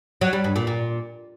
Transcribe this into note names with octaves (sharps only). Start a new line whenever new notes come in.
F#3
G3
G2
A#2
A#2